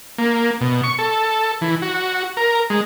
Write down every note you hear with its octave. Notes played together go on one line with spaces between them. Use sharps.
A#3
B2
C#6
A4
E3
F#4
A#4
G#3